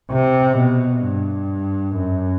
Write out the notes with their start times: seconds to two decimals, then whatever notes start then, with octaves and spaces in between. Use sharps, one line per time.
0.10 C3
0.57 B2
1.03 G2
1.97 F#2